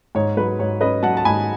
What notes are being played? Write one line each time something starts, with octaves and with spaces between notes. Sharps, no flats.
G#2 C#5
F#3 B4
G#2 C#5
C#4 B4 D#5
F#3 F#5 A5
A5
G#2 G#5 B5